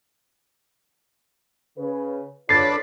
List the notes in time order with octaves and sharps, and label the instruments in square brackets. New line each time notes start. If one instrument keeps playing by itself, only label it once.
[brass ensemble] C#3 B4
[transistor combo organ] D4 A4 B4 [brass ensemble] F4 C#5 [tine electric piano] A6 C7